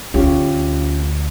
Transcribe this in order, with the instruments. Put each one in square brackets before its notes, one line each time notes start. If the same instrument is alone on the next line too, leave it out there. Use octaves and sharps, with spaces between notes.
[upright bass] D2 [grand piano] C#4 F4 G4